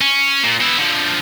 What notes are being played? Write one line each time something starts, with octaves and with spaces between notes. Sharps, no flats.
C#4
A#2
B2 E4
D3 F3